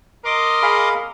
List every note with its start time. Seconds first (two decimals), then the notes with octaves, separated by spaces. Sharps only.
0.25 A#4 D#5 C6 D6
0.63 G#4 F5 B5